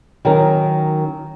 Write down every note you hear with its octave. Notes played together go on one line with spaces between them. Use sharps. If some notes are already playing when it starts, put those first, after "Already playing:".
D#3 F#3 C#4 A#4